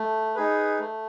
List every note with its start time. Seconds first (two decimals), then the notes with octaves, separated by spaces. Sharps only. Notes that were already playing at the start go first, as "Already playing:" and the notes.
Already playing: A3
0.35 D#4 G#4 B4
0.80 A3